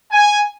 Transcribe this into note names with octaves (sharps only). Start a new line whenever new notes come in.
G#5